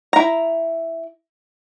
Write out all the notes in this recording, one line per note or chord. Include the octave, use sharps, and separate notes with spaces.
E4 A#5